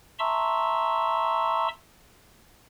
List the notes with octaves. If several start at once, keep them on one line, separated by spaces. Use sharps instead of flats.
E5 A5 A#5 C6 C#6 E6